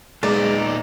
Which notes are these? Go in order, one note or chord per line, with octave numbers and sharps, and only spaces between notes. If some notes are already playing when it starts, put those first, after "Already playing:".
A#2 G#3 B3 D#4 D5